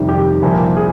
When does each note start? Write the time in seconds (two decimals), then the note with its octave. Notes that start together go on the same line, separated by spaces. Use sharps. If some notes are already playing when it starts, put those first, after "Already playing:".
Already playing: F2 C3 D#3 G3
0.09 G4
0.42 C2 A#2 F3 A#3
0.77 G#4